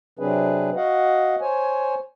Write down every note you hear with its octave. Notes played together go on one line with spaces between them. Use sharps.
C3 F#3 C4 D4 G#4 B4
F#4 D#5 F5 F#5
C5 C#5 G#5